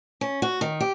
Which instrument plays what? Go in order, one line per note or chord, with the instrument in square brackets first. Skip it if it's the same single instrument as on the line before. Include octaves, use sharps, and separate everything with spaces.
[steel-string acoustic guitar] C#4
F#4
D#3
G4